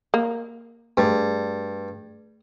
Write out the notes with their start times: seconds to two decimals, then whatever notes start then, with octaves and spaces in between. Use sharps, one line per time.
0.14 A#3
0.97 G2 A3 G#4 D5